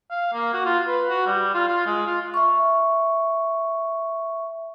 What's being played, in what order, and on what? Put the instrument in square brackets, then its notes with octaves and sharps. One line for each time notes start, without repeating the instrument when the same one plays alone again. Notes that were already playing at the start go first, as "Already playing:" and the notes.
[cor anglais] F5
A#3
F#4
F4
B4
F#4
G3
F4
F4
G#3
F4
[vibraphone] E5 C#6